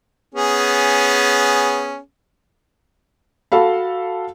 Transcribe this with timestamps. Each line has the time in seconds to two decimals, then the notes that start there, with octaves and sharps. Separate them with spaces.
0.35 B3 C#4 G#4
3.52 F#4 A4 F5 B5